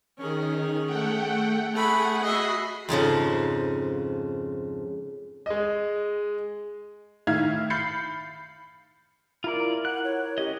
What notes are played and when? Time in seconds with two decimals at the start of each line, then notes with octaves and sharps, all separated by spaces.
0.18 D#3 C#4 G#4
0.85 A3 F#5 G5
1.73 A3 G#4 F#5 B5
2.23 F#4 D#5 E5 B5 C7
2.89 F2 G#2 C#3 F3
5.46 G#3 D#5
7.27 A2 D#3 E5 F5 F6 G#6
7.70 B5 G6 A6 C7 C#7
9.44 E4 F4 A#4 D5
9.85 F#5 F#6
10.04 C#5
10.38 C#4 G4 D#5